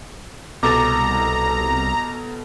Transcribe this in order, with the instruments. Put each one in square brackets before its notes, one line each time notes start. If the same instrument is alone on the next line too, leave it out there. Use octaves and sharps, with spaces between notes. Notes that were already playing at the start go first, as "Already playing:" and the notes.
[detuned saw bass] C2 [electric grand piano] B2 A4 A6 [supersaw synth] A#5 [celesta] D6